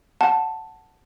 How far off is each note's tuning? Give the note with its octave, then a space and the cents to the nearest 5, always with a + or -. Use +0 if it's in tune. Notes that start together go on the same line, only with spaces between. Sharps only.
F#5 +0 A5 +0